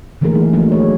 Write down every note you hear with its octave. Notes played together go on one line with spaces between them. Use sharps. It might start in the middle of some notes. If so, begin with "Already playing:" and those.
D3 E3 A3 A#3 G#4 A#4
F#3 D#4
F3 F#3 A3 A#3 D4 D#4
A3 G#4 C#5